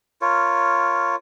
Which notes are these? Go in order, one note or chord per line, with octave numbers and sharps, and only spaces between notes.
F4 A#4 C#5